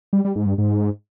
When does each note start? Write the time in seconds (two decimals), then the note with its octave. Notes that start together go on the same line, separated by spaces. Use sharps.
0.13 G3
0.25 G3
0.36 G#2
0.46 G2
0.58 G#2